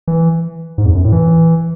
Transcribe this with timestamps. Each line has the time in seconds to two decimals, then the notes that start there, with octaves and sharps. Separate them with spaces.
0.08 E3
0.78 G#2
0.86 E2
0.95 F#2
1.04 A2
1.12 E3